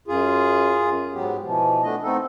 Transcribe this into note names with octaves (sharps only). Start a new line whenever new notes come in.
F#2 F4 G#4
G#2 F#3 B3 G4
B2 E3 F3
A3 B3 D4 D#5
A3 B3 C4 D#4 A4